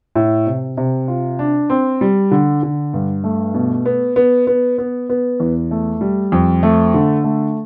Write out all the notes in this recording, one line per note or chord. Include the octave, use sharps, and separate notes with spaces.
A2
C3
C3
F4
D4
C4
G3
D3
D3
G2
A3
B2
B3
B3
B3
B3
B3
E2
A3
G3
F2
A3
D3
A3